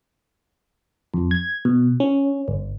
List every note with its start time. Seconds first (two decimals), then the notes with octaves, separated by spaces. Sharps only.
1.14 F2
1.31 G#6
1.65 B2
2.00 C#4
2.48 G1